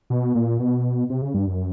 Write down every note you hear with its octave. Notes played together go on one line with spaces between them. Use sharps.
B2
A#2
B2
C3
C#3
G2
F#2